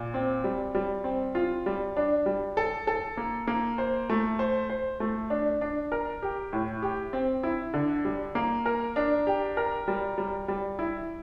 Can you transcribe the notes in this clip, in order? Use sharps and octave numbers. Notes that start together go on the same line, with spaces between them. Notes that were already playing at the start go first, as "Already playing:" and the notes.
Already playing: A#2
C4
G3
G3
C4
F4
G3
D4
G3
A4
A4
A#3
A#3
C5
A3
C5
C5
A3
D4
D4
A#4
G4
A2
G4
C4
E4
D3
G3
A#3
A#4
D4
G4
A#4
G3
G3
G3
E4